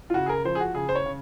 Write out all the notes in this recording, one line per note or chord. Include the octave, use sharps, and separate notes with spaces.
F4
C#3 F#4
G#4
A#4
F3 C5
G#4
F#4
C#3 G#4
C5
C#5
C#3